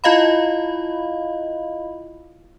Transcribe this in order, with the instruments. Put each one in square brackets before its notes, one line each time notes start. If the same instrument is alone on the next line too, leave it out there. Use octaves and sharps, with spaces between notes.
[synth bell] E4 F4 D#5 F5 B5